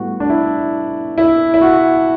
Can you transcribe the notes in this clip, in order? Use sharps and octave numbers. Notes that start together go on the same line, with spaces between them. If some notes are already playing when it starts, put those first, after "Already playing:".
Already playing: A2 G3 B3 F#4
D4
E4
E4
E4
F#4